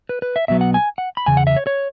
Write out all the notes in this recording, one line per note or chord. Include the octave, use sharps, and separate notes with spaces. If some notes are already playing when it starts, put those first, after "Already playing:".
B4
B4
E5
B1 B2 F#3 B3 E5
F#5
G#5
F#5
B5
E2 C#3 G#5
F#5
E5
C#5
C#5